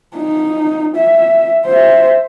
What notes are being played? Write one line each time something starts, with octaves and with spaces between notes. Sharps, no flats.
D#4
E5
C5 E5